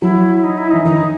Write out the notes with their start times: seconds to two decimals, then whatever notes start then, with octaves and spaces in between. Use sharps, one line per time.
0.02 F#3 E4
0.44 D#4
0.58 E4
0.71 E3 D#4
0.85 D#3 D#4